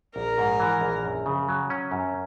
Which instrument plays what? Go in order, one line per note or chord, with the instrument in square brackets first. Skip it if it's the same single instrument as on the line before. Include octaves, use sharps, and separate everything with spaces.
[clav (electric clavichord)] A#1 [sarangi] A#4
[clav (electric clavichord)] G#2
E3
A#1
F#2
C#3
F#3
C#4
F#2